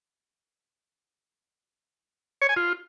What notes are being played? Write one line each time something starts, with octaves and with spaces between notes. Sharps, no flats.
C#5
G#5
F4